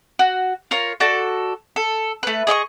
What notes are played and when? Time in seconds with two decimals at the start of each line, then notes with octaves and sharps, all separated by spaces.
0.19 F#4
0.71 F4 A#4 C#5
1.00 F#4 A4 D5
1.76 A4
2.23 A3 B4
2.47 G#4 D#5 E5 C#6